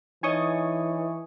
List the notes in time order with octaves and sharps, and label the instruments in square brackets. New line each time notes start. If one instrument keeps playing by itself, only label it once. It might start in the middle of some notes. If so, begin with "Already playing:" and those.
[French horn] E3 [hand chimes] D#4 C#5 D#5 [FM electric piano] G#5 C#6 D#6